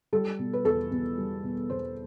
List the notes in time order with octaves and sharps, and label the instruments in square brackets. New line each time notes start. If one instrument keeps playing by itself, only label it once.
[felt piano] G3 A4
B2
B4
E2 A4
E2
G3
B2
E2 C5